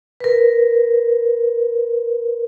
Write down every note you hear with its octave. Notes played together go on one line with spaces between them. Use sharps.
A#4 B4